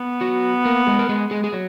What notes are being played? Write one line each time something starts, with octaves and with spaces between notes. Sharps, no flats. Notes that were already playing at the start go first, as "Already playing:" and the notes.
Already playing: B3
F#3 F#4
A#3 A#4
G#3 G#4
A#4
G#3 G#4
G#3 G#4
G#4
F#3